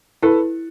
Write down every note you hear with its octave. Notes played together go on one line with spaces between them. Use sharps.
E4 A4 B4